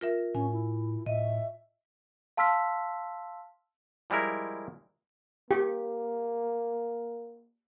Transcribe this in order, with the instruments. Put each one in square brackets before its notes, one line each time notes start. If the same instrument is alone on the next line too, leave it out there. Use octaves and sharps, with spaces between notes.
[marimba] F4 A#4 E5
[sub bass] A2 [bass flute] C#4 [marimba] G#5
[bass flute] E4
[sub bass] A2 [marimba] D#5 [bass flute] E5
[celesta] F5 A5 C6 E6 F6 B6
[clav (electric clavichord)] F3 G3 G#3 E4 A#4
[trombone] A#3 [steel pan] G4